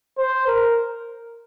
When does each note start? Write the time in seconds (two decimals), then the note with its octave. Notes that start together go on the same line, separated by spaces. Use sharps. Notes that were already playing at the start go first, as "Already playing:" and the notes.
0.18 C5
0.47 A#4